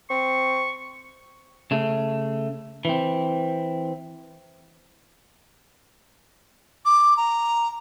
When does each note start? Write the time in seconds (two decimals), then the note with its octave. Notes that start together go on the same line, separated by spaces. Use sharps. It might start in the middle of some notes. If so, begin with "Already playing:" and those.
0.10 C4 C#6
1.71 C#3 A3
2.85 E3 C4
6.85 D6
7.17 A#5